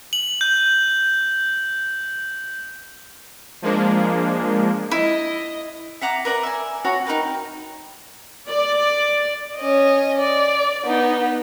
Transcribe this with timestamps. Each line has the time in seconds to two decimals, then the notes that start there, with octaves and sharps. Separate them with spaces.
0.13 F#7
0.41 G6
3.62 F3 G#3 A#3 D4
4.91 E4 D#5
6.01 E5 F#5 A#5 D6
6.25 A#4 B4 D5 A#5
6.43 E5 G#5
6.85 F#4 C#5 A#5
7.05 D#4 A#4 B4 G5
8.49 D5
9.57 C#4 D#5
10.19 D5
10.85 B3 D#4